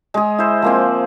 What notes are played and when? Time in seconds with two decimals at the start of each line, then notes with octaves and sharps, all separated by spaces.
0.14 G#3 G#4
0.38 E4 C5
0.62 F3 A#3 C4